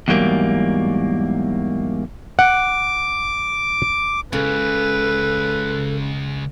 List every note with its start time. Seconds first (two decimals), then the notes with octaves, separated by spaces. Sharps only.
0.08 E2 G#2 F#3 G3 A#3
2.39 F#5 D6
4.33 C#2 C#3 A4 B4